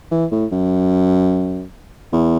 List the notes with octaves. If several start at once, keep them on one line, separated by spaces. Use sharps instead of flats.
E3
A2
F#2
E2